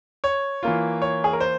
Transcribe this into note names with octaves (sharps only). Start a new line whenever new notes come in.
C#5
E3 A#3 F4
C#5
G#4
A#4
C5